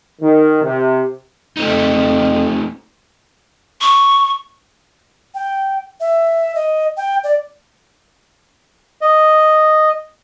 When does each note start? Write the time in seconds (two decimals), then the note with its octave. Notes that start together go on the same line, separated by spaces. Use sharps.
0.22 D#3
0.63 C3
1.57 F2 A3 C4 D#4
3.81 C#6
5.35 G5
6.00 E5
6.55 D#5
6.97 G5
7.24 D5
9.01 D#5